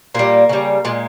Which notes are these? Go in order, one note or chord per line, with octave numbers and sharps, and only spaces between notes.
A#2 G3 A#3
C#3 G3
A#2 G#3